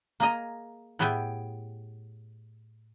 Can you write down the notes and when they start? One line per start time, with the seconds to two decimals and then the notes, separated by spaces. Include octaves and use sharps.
0.20 A#3 G#4 D#5 A#5
0.99 A2 B3 G4 G#4 E5 G5